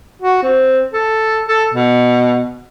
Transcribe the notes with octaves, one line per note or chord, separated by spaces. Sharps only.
F#4
C4
A4
A4
B2